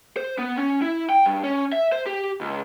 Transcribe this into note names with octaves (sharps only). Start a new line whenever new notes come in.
C5
B3
C#4
E4
G5
G2
C#4
E5
C5
G4
C#2